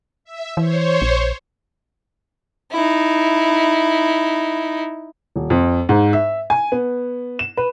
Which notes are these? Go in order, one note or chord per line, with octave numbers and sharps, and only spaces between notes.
E5
E3 C5 C#5
A#1
D#4 E4
D#1
F2
G#2
E5
G#5
B3
E7
B4